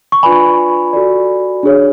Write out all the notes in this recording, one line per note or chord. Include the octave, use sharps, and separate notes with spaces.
C#6
D4 F4 B4 D5 G#5 B5
F#4 A4 D5
D4 G#4 C#5